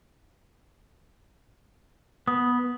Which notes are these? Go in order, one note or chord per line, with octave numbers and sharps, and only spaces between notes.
B3 D#6